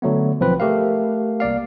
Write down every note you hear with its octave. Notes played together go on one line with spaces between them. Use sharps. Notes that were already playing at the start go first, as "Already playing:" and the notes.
D3 F#3 A3 B3
B1 F3 C4 B4
A3 G4 A#4 F5
C2 A#3 D5 F5